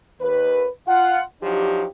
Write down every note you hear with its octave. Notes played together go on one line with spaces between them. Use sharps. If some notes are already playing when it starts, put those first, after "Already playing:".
D#2 B4
F4 F#5
F3 F#3 D4 D#4 G4